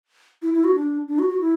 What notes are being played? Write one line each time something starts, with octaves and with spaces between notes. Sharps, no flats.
E4
E4
F#4
D4
D4
F#4
F#4
E4